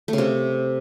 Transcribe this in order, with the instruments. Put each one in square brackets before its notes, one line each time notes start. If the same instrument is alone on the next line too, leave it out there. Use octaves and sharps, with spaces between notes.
[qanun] A3
C#3
C3